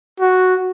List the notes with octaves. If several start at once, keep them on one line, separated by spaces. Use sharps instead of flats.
F#4